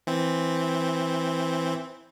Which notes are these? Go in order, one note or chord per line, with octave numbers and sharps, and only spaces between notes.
E3 C4